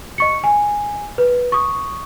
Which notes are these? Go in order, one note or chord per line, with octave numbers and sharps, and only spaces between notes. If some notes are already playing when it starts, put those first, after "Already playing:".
D#5 C#6 C#7
G#5
B4
C#6 D#6